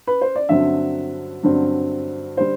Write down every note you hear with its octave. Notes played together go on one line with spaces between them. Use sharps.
B4
C5
D5
G2 D3 F#3 C4 E5
G2 D3 F#3 C4
D3 G3 C5